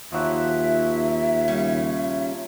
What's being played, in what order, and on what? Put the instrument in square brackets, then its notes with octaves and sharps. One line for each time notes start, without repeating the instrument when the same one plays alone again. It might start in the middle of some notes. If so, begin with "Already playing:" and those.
[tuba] D#2 [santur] F3 F#3 F#5 [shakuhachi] E5
[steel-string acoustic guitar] C#3 G3 C#4